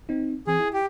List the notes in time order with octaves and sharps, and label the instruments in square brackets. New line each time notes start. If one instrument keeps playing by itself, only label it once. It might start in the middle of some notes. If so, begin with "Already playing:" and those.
[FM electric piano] C4 D#4
[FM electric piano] E3 C4 [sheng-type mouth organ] G#4
[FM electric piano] E4
[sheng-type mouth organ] G4